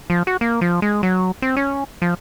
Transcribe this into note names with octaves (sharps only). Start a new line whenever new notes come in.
F3
F#4
A#3
F3
G#3
F#3
C4
C#4
F3